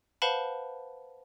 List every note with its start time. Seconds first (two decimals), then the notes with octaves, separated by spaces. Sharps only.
0.22 B4 C5 F5 F#5 A5 B5